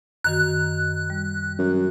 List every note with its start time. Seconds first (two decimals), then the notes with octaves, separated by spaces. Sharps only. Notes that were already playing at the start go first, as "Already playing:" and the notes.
0.24 F#2 D#3 F#4 F#6
1.10 G3
1.58 F#2